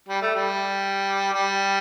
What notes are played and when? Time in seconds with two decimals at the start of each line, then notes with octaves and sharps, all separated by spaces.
0.09 G3
0.22 A3
0.35 G3
1.33 G3